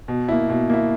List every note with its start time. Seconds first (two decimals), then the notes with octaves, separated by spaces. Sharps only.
0.08 B2
0.28 A#3 E4
0.49 B2
0.70 A#3 E4